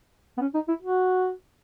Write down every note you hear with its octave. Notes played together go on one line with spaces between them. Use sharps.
B3
C#4
D#4
E4
F#4